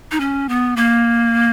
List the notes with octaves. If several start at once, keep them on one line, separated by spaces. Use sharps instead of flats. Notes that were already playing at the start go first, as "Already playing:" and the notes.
D#4
C#4
B3
A#3